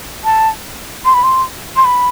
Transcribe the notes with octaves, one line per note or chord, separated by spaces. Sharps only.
A5
C6
B5
C6
C6
B5